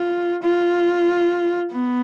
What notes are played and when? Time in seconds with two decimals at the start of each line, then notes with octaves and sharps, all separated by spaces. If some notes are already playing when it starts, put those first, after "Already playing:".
Already playing: F4
0.43 F4
1.72 B3